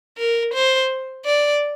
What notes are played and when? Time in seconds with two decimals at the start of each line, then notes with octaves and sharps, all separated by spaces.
0.18 A#4
0.54 C5
1.26 D5